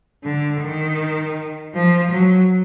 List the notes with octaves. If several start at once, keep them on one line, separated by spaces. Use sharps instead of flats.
D3
D#3
F3
F#3